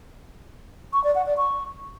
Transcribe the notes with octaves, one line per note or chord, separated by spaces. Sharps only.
C#6
D5
F#5
D5
C#6